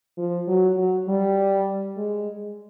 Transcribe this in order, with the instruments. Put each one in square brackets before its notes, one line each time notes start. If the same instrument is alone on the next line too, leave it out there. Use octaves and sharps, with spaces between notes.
[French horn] F3
F#3
F#3
G3
G#3